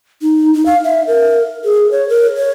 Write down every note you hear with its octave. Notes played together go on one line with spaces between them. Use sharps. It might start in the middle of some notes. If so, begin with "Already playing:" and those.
D#4
D#4
F5
E5
A#4
G#4
C#5
A#4
C#5